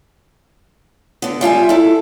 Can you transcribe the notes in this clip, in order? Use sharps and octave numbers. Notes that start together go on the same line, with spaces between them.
D3 B3
G3 F4 E5 G#5
E4 A4